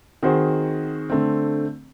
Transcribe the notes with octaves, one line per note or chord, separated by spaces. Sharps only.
D#3 C4 F#4 G#4 C5
D3 A3 C4